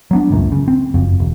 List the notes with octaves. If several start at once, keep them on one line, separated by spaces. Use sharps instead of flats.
F#3 B3 D4
G#1 C#2 F#2 A#2
C#3
C4
F#1 F2
E1